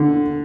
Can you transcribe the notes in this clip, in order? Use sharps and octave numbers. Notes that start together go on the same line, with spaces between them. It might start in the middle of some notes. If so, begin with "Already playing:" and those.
Already playing: D3